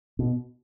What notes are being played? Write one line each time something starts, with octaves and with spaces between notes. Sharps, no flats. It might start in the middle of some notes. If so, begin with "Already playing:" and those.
B2